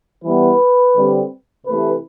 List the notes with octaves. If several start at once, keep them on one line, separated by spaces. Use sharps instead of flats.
E3 G3 B3 B4
D3 G3 C4
C3 E3 A3 B4